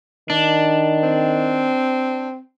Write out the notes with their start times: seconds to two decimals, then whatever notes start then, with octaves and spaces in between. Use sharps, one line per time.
0.30 D#3 D4
1.03 C4